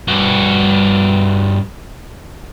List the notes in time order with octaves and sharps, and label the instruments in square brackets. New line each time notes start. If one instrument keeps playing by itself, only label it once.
[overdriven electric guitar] G2 F#4